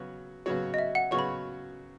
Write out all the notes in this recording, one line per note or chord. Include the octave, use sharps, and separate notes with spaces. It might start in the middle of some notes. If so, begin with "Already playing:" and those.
Already playing: C#3 F#3 B3 F#4 C#5
C#3 F#3 B3 F#4 C#5
D#5
E5
F#5
C#3 F#3 B3 F#4 C#5 C#6
B5